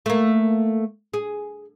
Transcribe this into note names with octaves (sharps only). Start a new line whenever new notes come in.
A3 A#3
G#4